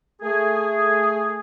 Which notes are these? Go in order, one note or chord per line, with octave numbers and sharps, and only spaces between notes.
A3 G#4